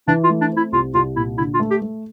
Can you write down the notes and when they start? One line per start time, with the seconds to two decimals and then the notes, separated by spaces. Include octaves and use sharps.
0.08 E3 D4
0.24 F4
0.29 A3
0.41 D4
0.51 C4
0.57 E4
0.72 C2 F4
0.94 C2 F4
1.16 A#2 E4
1.38 D3 E4
1.54 F4
1.60 A3
1.71 G4
1.82 A3